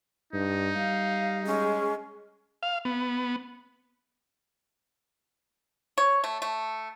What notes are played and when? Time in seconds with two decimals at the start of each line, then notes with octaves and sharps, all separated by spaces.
0.33 G2 D#4
0.77 G3 F5
1.46 G#3 C#4
2.63 F5
2.85 B3
5.98 C#5
6.24 A3
6.42 A3